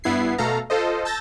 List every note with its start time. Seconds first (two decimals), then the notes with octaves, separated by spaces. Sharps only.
0.04 G2 B3 E4 G#6 C7
0.38 B2 A3 A4 F5 A#5
0.70 F4 A4 C5 D#5
1.05 A5 E6 G6 A6 A#6